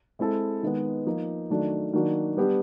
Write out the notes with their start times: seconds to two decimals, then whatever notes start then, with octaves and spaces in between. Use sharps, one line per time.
0.19 G#3 C4 E4 A4
0.63 D#3 G#3 B3
1.06 F3 A#3 D#4
1.50 D#3 F#3 A3 D4
1.94 D#3 F#3 A#3 D4 F#4
2.37 G3 B3 D4 G4